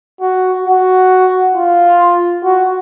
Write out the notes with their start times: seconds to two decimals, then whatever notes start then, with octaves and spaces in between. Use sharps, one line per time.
0.21 F#4
0.66 F#4
1.55 F4
2.44 F#4